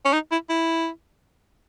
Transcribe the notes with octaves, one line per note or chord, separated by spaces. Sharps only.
C#4
D#4
E4
E4